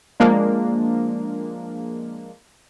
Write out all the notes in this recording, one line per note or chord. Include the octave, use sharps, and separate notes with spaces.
F3 G#3 A#3 D4